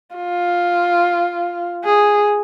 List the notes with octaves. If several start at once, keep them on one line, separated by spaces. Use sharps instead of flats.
F4
G#4